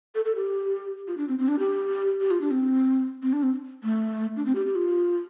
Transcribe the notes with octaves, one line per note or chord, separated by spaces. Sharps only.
A4
A4
G4
F4
D4
C4
C4
D4
G4
G4
F4
D4
C4
C4
D4
C4
A3
D4
C4
G4
G4
F4